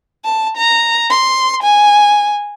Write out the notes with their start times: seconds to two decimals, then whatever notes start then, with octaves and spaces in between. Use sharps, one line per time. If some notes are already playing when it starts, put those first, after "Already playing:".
0.25 A5
0.57 A#5
1.10 C6
1.63 G#5